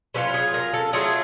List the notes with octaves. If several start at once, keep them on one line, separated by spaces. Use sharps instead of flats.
F#3 A3 C#4 F4 B4
G#4
A#4
A4
F#3 A3 C#4 F4 G#4